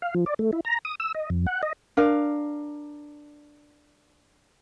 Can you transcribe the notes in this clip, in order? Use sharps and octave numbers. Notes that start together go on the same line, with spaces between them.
F5
F3
D5
A3
E4
A#5
D#6
E6
D#5
F2
F#5
D#5
D4 A#4 F5